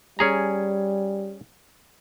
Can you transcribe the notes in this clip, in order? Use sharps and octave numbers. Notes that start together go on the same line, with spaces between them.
G3 C#4 G#4 A#5